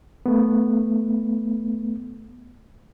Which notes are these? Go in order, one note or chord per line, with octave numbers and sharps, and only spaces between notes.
A3 B3